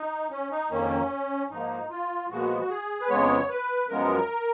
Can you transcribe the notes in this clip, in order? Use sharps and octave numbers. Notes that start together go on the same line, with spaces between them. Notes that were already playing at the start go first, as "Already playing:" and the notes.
Already playing: D#4
C#4
D#4
F2 D#3 A#3 C#4
G#2 F3 A#3 D#4
F4
A#2 F3 G#3 B3 F#4
F#4
G#4
B4
F2 C#3 G#3 B3 C#5
B4
F#2 F3 G#3 B3 A#4